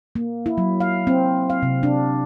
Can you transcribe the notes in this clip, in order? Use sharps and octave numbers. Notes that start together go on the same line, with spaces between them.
A#3
E4
F#3
F5
C4
F5
C3
D4